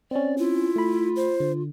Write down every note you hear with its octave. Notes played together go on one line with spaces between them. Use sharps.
C4 C#4 D5
E4 F4
A3 B5
C5
D3